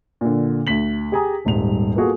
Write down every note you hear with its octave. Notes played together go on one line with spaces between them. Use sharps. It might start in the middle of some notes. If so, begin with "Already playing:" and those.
A#2 D3
D2 B6 F#7
G4 G#4 G#5 A#5 D#6
D#1 G#1 G#2 G3 F7
A#3 B3 F4 F#4 G#4 A4